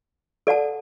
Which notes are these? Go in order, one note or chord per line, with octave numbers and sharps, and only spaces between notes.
A4 D5 F#5 A5